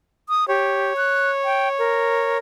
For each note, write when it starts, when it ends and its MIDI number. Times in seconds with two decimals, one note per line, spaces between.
0.29 0.48 87
0.48 0.93 67
0.48 2.37 73
0.97 1.30 90
1.45 1.69 79
1.79 2.39 70